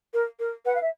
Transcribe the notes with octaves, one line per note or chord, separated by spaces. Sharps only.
A#4
A#4
B4 F#5
F5
E5